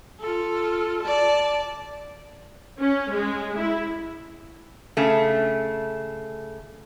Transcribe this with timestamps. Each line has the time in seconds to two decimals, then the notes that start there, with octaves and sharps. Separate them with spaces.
0.20 F4 A4
1.02 D5 A5
2.81 C#4
3.11 G#3
3.58 E4
4.97 C#3 A3